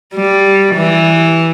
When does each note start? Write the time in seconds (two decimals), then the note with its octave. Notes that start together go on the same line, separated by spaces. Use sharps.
0.15 G3
0.75 E3